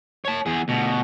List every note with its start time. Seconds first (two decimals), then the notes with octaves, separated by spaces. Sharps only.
0.25 C#5 A5
0.46 E2 G#4
0.68 D2 B2